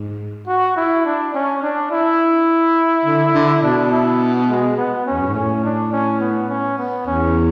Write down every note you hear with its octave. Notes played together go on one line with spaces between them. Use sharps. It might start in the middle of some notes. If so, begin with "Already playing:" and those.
Already playing: G#2
F#4
E4
D4
C#4
D4
E4
D3
D3
B2 D4
E4
G#3
B3
C#4
E2
F#2
G#2
A2 C#4
D4
C#4
B3
C#4
B3
E2 C#4